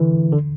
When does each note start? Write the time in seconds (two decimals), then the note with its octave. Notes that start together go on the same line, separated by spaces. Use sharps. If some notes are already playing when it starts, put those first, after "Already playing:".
Already playing: D3 E3
0.32 D3